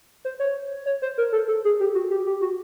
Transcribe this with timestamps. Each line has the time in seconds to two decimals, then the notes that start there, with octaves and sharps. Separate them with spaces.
0.25 C5
0.40 C#5
0.86 C#5
1.02 C5
1.18 A#4
1.32 A4
1.48 A4
1.65 G#4
1.80 G4
1.95 F#4
2.11 G4
2.27 G4
2.41 F#4